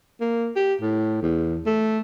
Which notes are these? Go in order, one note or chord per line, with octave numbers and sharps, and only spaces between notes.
A#3
G4
A2
E2
A3